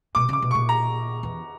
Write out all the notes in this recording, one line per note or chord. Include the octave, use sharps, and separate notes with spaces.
B2 D6
C#3 D6
B2
A#2 C#6
A#5
E2